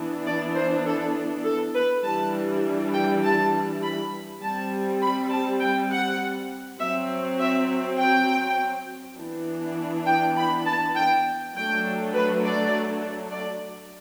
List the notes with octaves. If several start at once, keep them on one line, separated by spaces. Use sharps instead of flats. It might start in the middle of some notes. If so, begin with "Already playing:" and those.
Already playing: E3 B3 D4
D5
C5
A4
A4
B4
E3 G3 D4 A5
G5
A5
B5
G3 C4 A5
B5
A5
G5
F#5
F#3 C4 E5
E5
G5
E3 B3 D4
G5
B5
A5
G5
F#3 A3 D4 G5
B4
D5
D5